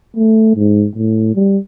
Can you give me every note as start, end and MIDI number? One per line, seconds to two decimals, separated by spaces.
0.17 0.52 57
0.56 0.86 44
0.96 1.35 45
1.35 1.58 55